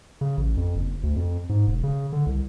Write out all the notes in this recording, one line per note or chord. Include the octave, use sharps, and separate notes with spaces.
C#3
A1
F2
F#1
D2
F2
G#2
E1
C#3
D3
C2